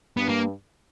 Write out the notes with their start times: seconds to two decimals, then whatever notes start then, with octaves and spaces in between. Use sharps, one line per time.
0.17 G2 B3
0.29 A#3